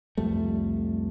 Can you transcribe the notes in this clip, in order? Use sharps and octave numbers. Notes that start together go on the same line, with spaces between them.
C2 F2 G3 A3